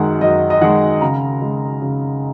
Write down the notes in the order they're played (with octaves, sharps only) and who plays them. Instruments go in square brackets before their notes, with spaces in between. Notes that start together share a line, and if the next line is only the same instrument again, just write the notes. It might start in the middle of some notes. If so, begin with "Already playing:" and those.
Already playing: [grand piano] F#2 D#3 G#3 F#5
F#2 D#5
D#5
D#3 G#3 F#5
C#3 A#5
G#3
C#3